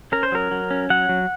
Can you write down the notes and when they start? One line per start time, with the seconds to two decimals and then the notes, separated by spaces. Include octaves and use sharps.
0.12 C#4 A#4
0.23 C5
0.32 F#3 A#4
0.51 F#3
0.70 C#4
0.90 F#3 F#5
1.09 F#3